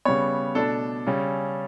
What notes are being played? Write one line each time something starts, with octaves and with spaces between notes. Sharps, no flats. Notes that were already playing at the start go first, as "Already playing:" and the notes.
C#3 G3 B3 C#5
B2 A3 D4 A4
C#3 G3 C#4